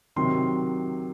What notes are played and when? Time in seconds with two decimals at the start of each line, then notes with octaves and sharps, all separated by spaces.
0.16 C3 D#3 F#3 C6